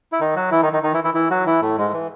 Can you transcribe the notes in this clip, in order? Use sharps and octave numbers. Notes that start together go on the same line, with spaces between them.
E4
D#3 D#4
F#3 F#4
E3 E4
D#3 D#4
D#3 D#4
D#3 D#4
E3 E4
E3 E4
E3 E4
F#3 F#4
E3 E4
A2 A3
G#2 G#3
E3